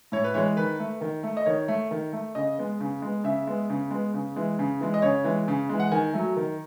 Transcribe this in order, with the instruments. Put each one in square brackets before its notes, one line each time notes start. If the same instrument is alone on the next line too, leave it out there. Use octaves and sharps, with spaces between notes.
[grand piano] A2 C#5
B4
E3 G#3 C#5
D#3 B4
A3
D#3
A3
D#5
D#3 C#5
A3
D#3
A3
C#3 D#5
G#3 B3
C#3
G#3 B3
C#3 E5
G#3 B3
C#3
G#3 B3
C#3
E3 G#3
C#3
E3 G#3
D#5
C#3 C#5
E3 G#3
C#3
E3 G#3
F#5
D#3 G#5
F#3 A3
D#3